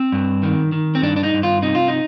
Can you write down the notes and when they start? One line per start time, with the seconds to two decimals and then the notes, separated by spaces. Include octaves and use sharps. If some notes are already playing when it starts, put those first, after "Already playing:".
Already playing: C4
0.12 G2
0.43 D#3
0.72 D#3
0.95 C4
1.02 G2 D4
1.16 D4
1.23 D#4
1.33 G2
1.43 F4
1.62 C3 D#4
1.75 F4
1.88 D#4